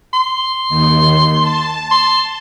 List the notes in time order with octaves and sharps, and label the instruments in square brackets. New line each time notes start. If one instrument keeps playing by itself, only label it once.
[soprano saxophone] C6
[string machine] D#2 D#3
A5
[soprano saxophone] C6